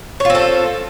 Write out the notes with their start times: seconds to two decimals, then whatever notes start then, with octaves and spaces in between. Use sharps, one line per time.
0.20 C#5
0.25 F4
0.30 C4
0.35 A4